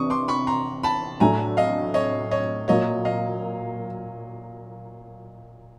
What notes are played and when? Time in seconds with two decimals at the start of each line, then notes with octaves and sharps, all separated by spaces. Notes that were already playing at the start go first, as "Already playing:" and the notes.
Already playing: C3 E3 D4 C#6 D#6
0.10 C6 D6
0.28 B5 C#6
0.47 A#5 C6
0.83 A5 B5
1.20 A2 F#3 A3 D4 G#5 A#5
1.57 D#5 F5
1.94 C#5 D#5
2.31 C#5 D#5
2.68 A#2 F#3 A#3 C#5 D#5
3.05 D#5 F5